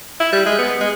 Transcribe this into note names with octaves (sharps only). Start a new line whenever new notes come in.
E4
G3
G#3
B3
G#3